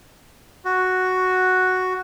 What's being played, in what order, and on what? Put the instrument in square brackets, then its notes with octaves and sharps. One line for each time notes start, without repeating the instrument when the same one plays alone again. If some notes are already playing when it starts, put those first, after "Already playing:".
[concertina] F#4